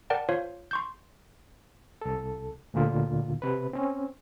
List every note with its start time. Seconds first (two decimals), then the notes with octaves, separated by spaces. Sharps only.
0.10 A#4 D5 F#5 G5 A5
0.29 F4 C5 C#5 F5
0.71 C6 C#6 G6
2.02 C2 A4
2.74 D2 A#2 D3 F4
3.42 C3 B4
3.73 C4 C#4